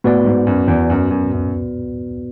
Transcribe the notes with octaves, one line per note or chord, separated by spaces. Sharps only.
A2 B3 F#4 B4 D5
G#2
F#2
E2
F#2
F#2
F#2